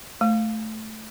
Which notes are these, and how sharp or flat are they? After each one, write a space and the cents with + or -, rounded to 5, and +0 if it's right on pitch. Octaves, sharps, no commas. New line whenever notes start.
A3 -5